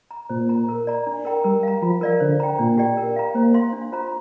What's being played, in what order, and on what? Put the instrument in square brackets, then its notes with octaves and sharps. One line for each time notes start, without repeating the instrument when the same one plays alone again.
[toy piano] A#5
[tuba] A#2 [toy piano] C5
[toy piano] A#5
A#4
D5 A#5
D4
A#4 G5 A#5
[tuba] G3 [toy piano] A#4
[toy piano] F5 A#5
[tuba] F3 [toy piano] F4
[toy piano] A#4 D5 F5
[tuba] D3 [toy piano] C5
[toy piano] G5 A#5
[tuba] A#2 [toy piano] D4
[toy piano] G4 D5 G5
A#4
F5 A#5
[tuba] A#3 [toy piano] C5
[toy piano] F5 C6
D4
F4 C5 A#5